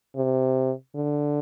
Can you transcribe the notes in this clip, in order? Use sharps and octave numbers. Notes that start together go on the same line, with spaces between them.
C3
D3